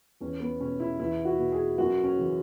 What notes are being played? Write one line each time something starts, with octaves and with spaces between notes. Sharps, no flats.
E2 C#4
B3
B2 C#4
E4
E2 E4
F#4
B2
G#4
F#2 F#4
C#4
C#3 E3